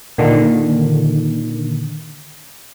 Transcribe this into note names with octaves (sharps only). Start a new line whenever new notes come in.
A#2 D3 D#3